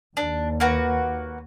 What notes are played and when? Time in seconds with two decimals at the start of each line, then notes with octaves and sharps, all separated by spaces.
0.17 D#2 D4
0.60 A#3 F#4 B4